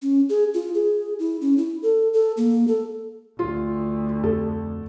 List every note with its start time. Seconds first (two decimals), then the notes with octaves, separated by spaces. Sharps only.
0.02 C#4
0.29 G#4
0.54 F4
0.74 G#4
1.19 E4
1.41 C#4
1.58 E4
1.82 A4
2.13 A4
2.37 A#3
2.68 A4
3.39 D2 F4
4.23 F2 A4